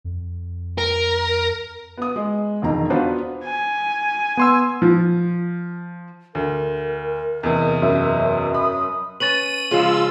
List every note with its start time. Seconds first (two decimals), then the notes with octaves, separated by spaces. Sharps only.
0.04 F2
0.78 A#4
1.97 B3 D#6
2.16 G#3
2.62 E1 F2 D#3 A#5
2.90 B3 D4 F4 F#4 B4 C5
3.45 G#5
4.37 B3 C6 E6
4.82 F3
6.35 D2 A#4
7.43 E2 C3 D#5
7.82 F#2 E5
8.54 B5 D#6
9.20 C#4 B4 A6 D#7 F#7
9.71 C#3 F3 G#3 F4 E6